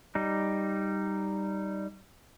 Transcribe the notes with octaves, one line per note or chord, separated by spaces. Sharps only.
G3 D#4